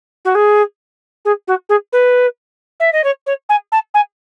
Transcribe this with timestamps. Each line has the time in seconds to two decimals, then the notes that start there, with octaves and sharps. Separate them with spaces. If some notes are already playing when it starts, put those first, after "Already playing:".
0.25 F#4
0.35 G#4
1.25 G#4
1.47 F#4
1.69 G#4
1.92 B4
2.80 E5
2.92 D#5
3.04 C#5
3.26 C#5
3.49 G#5
3.72 A5
3.94 G#5